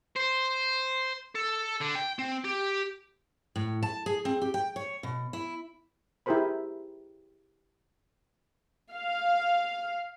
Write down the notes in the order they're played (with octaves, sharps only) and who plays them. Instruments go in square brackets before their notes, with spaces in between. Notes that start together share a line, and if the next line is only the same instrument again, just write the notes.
[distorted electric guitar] C5
A4
D3
G5
C4
G4
[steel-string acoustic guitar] A2
A5
G#4
C4
G4
G5
C#5
B2
E4
[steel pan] E4 G4 G#4 A#4 C5 B5
[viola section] F5